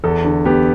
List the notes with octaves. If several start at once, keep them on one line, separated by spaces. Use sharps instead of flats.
E2 A4
D3
B3 G4